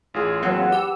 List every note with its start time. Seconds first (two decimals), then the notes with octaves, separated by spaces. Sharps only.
0.14 A1 F4 G#4
0.42 F#3 A#3 C4 B4 F#5 A5
0.72 G4 E6